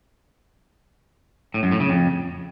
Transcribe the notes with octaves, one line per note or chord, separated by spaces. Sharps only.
A2
F#2
A2
C#3
F2